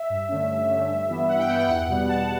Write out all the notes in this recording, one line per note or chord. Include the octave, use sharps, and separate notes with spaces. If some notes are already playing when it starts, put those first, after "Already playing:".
Already playing: E5
G2
D3 A3 C#4
G2
D3 A3 C#4
G2
E3 B3
G2 F#5
G5
E3 B3 F#5
G5
E2 F#5
B2 G3 B3
E2 A5